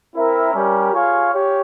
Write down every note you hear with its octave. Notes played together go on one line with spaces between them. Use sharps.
C4 E4 A#4 E5
G3 C#4 G4 A#4
F4 G#4 C#5 F5
G4 C#5